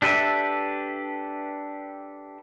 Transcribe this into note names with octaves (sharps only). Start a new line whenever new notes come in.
D4 G4 A4 B4 E5